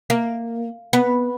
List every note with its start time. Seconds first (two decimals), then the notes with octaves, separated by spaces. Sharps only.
0.10 A#3
0.93 B3